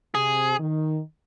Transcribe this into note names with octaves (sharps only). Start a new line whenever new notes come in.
C3 G#4
D#3